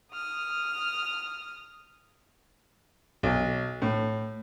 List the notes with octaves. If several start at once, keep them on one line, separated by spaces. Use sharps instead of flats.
D#6 F6
B1
A2